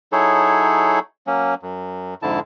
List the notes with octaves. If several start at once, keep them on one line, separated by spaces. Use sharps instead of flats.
F#3 D#4 E4 G#4 A4 C#5
F#3 A#3 C#4
F#2
F2 G#2 D3 E4 A5